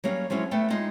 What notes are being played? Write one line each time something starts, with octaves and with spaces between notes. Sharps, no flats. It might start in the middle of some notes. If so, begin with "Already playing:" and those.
F#3 G3 A#3 C#4
F3 F#3 G#3 C#4 E4
A3 B3 C5 G5
G#3 D#4 F4